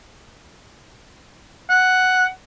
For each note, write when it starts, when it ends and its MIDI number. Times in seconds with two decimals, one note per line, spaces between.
1.70 2.26 78